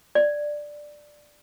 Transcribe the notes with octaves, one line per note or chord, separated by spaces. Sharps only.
D5